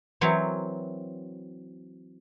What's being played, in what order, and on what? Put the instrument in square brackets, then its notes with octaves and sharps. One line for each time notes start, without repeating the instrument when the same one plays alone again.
[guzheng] E3 F#3 C4 A#4 C#5